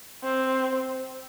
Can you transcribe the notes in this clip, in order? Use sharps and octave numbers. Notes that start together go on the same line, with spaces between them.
C4